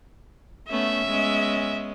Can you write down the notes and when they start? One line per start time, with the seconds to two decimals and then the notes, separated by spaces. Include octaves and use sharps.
0.70 A3 B3 C#4 E5
1.08 G#3 B3 C#4